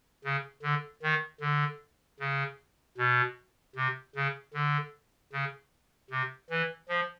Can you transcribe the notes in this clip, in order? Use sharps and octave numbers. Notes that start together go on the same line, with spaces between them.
C#3
D3
D#3
D3
C#3
B2
C3
C#3
D3
C#3
C3
E3
F3